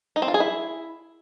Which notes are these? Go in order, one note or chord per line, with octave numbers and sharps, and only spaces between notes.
D#4
C4
F4
G#4
E4